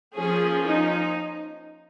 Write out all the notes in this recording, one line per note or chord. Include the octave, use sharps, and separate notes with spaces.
F3 A#3 C#4 G#4
D#4